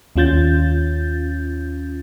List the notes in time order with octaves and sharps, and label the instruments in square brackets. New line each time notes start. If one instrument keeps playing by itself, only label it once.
[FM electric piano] D#2 C#4 F4 G6 A6